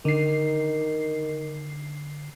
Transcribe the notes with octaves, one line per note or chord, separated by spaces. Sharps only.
D3 D#3 C7